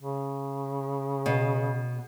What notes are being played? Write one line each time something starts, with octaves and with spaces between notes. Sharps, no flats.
C#3
B2